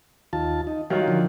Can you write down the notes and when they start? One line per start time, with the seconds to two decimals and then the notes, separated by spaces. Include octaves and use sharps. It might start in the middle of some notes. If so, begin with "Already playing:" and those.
0.33 D#2 F4 A5
0.67 D#4
0.90 D#3 F#3 G3 F4 F5
1.08 D3 F3